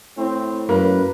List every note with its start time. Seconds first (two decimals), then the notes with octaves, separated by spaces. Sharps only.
0.17 A2 C4
0.69 F#2 A#3 B4